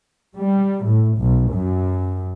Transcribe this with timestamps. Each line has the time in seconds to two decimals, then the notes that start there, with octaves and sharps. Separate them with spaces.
0.36 G3
0.85 A2
1.18 B1
1.51 F#2